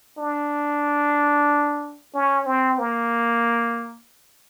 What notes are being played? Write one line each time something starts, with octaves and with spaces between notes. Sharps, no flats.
D4
C#4
C4
A#3